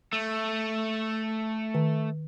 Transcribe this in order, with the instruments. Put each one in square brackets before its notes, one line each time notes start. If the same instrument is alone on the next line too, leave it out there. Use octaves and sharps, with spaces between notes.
[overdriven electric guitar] A3
[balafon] D#3